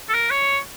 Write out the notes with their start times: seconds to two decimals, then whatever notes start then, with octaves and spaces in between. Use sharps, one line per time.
0.09 A4
0.14 A#4
0.30 C#5